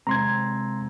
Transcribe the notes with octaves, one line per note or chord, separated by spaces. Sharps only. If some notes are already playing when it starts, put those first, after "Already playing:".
C3 G#3 C4 A#5 C6 G#6